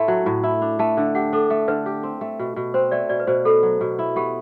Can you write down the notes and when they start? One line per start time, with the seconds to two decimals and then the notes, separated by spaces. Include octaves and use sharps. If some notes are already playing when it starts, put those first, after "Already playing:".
Already playing: A2 A3 E4 C6
0.08 F#3
0.26 A2
0.43 E4
0.62 D4 B5
0.79 A3 A5
0.97 D3
1.15 G4 F#5
1.33 D4 A4
1.50 A3
1.68 D3 B4
1.86 G4
2.03 C4
2.21 A3
2.39 B2
2.56 B2
2.74 C4 C5
2.91 A3 D5
3.09 B2 D5
3.20 B4
3.27 B2 C5
3.45 B3 A4
3.63 F#3
3.81 B2
3.99 E4
4.16 B3 G4